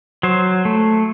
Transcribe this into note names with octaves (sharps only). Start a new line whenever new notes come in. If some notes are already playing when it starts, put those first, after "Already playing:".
F#3 C5
A3